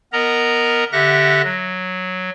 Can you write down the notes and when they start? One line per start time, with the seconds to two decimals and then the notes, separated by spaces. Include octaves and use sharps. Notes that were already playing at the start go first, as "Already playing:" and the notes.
0.13 B3 A#4 D#5 A#5
0.93 D3 G4 E5 F#5 F#6 A#6
1.44 F#3